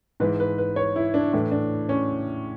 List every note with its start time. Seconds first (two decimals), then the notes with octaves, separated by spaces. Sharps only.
0.20 G#2 E3 B4
0.40 B4
0.58 B4
0.76 C#5
0.96 E4
1.14 D4
1.33 A2 E3 D4
1.52 D4
1.89 C#4